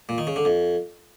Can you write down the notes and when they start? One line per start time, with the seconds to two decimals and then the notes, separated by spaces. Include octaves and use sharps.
0.09 A#2
0.18 D#3
0.27 C#3
0.36 D3
0.45 F2